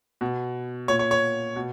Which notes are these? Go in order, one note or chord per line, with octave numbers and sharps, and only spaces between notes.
B2
A#2 C#5
C#5
C#5
B2